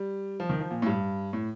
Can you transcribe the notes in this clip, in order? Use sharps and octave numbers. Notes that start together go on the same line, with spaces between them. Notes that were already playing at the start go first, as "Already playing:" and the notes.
Already playing: G3
F3
D#3
F3
A#2
A2
G2
A2